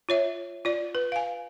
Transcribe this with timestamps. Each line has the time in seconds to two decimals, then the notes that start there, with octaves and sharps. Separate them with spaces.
0.09 F4 C#5 E5
0.65 F4 D5
0.95 B4
1.12 F5 G#5